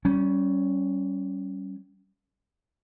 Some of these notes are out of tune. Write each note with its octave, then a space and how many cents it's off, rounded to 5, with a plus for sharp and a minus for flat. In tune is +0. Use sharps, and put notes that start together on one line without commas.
G3 -25 C#4 +0